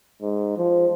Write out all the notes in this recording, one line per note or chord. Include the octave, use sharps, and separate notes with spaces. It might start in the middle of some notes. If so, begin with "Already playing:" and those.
G#2
F3